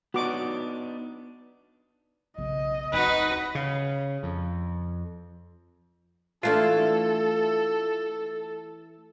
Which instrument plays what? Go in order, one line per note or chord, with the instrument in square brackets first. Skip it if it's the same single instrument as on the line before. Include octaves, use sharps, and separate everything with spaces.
[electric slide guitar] B3 D4 D#4 [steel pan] F#4 D6
[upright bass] B1 C#3 [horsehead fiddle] D#5
[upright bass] D1 C4 [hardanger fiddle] D#4 F#4 [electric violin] B4
[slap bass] C#3
F2
[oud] E3 A3 D4 [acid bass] F4 [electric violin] A4